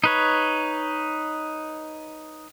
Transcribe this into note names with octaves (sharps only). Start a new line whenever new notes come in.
D#4 B4 C#5